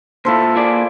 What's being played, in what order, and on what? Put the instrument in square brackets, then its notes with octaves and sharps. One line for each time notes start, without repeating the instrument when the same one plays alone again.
[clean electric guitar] A#2 E4 [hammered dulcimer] F4 A4 C5
[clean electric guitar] A#3 G#4 D5